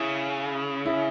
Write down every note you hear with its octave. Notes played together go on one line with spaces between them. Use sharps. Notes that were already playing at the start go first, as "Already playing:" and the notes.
Already playing: C#3 E4
E4